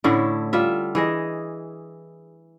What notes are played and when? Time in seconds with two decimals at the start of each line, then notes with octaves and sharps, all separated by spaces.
0.04 A2 D3 C#4 E4
0.53 G3 F4 E5
0.95 E3 G#4 D#5